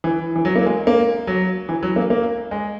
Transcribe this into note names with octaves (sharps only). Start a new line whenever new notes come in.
E3
E3
F#3
A#3
G#3
A#3
F#3
E3
F#3
A#3
A#3
G#3